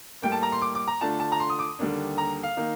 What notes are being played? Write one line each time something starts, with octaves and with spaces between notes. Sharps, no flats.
A2 G3 A#3 G5
A5
A#5
C6
D6
D6
A#5
D3 A3 D4 F4 A5
A5
A#5
C6
D#6
D6
D#2 D3 G3 A#3 D4
A#5
F5
D#3 A#3 D#4